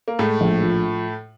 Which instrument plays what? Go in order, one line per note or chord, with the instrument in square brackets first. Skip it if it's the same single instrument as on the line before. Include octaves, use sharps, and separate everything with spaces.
[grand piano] A#3
[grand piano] A2 A3 [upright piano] G#3
[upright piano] A#1
F3